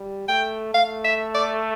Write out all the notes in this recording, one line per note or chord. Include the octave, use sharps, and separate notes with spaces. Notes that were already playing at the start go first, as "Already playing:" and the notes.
Already playing: G3
A3 G5
A3 F5
E5
D5